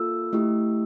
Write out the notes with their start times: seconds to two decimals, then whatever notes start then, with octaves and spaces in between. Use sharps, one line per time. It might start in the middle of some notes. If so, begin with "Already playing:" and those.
Already playing: A#3 F4 A4 E6
0.33 A3 E4 G4